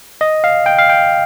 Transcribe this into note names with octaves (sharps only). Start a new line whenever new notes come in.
D#5
F5
G5
F5
G5